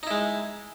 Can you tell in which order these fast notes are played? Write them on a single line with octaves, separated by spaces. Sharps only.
D#4 E4 G#3